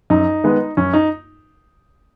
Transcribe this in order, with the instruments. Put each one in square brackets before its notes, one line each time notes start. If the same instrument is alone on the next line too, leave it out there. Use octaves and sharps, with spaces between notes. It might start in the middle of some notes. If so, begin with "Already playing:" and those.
[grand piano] F#2 D#4
D#3 G#3 B3
F#2 C#4
D#4